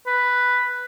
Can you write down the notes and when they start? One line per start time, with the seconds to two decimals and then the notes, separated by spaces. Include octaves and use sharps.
0.07 B4